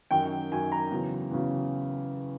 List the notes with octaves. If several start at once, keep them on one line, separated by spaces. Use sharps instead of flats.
F#2 D#3 F#3 G5
F#2 D#3 F#3 G#5
A#5
E2 C#3 F#3
E2 C#3 F#3